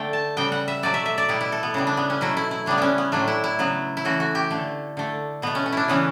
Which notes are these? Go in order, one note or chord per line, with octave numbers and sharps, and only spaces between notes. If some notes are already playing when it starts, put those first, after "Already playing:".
Already playing: D3 A3 G5
A5
C#3 G3 B3 G5
F#5
E5
B2 F#3 A3 D5
E5
E5
D5
B2 G3 B3 E4
E4
A4
B3
C#3 G3 B3
D4
B3
C#4
B2 F#3 A3 E4
E4
E4
C#3 G3 B3 D4
B3 C#4
B3
A2 F#3 A3 D4
E4
E4
C#3 F#3 B3
E4
C#3 E3 A3 F#4
F#4
G4
D3 A3
D3 A3
B2 A3 B3
C#4
C#4
D4 E4
C#3 E3 B3 C#4